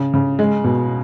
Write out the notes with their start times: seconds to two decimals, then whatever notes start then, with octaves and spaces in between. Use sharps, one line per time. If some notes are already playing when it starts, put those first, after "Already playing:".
Already playing: C#3
0.14 C#3
0.39 G#3
0.64 B2